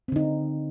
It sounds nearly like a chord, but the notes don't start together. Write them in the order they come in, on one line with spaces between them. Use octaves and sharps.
C4 D3 D#4